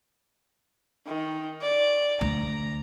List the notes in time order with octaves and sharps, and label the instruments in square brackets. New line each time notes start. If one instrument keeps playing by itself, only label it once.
[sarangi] D#3
D5
[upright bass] D2 [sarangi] A#5